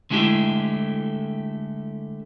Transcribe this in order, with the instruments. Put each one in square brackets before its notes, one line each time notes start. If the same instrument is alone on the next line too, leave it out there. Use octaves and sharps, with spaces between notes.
[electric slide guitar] D3 G#3 A3 E4 G4